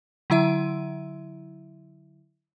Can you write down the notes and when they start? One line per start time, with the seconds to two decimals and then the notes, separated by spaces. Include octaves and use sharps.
0.30 D3 F#3 E4 E5 D#7